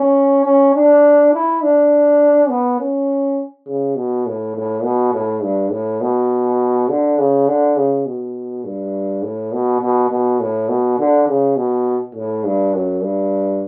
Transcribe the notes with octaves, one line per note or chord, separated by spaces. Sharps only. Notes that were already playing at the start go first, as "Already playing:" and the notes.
Already playing: C#4
C#4
D4
E4
D4
B3
C#4
C#3
B2
A2
A2
B2
A2
G2
A2
B2
D3
C#3
D3
C#3
B2
G2
A2
B2
B2
B2
A2
B2
D3
C#3
B2
A2
G2
F#2
G2